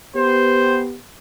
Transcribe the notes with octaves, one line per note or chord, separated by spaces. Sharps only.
B3 G4 C5